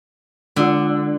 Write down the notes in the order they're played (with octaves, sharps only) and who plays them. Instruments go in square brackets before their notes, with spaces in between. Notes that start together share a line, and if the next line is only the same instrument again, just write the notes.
[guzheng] D3 [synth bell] G#3 F4